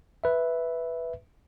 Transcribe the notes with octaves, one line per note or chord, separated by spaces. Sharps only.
B4 E5